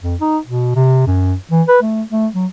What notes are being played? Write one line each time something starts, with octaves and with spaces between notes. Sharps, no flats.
F2
D#4
B2
C3
F#2
E3
B4
A3
A3
F#3